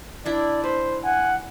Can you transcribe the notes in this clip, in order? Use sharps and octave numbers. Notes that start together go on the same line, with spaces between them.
D4 E4 D5
B4 C5
F#5 G#5